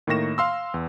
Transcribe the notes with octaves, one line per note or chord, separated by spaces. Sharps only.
A2 D#3 A#3 C#6 A#6 E7
F5 C6 E6
E2